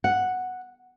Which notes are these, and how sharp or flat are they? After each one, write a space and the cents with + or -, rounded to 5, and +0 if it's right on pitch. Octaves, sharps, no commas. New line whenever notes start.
F#5 -5